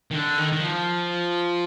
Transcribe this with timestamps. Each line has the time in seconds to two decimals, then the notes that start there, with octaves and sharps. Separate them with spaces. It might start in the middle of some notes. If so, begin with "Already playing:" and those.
0.11 D#3
0.15 D3
0.38 D#3
0.53 D#3
0.60 F3